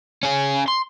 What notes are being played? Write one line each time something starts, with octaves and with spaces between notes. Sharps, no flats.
C#4 G#4
C6